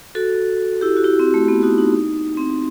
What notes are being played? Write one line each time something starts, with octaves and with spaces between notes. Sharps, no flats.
F#4 A4
E4 G4
F#4
E4 G4
C4
A3
B3
D#4 F#4
D#4
C4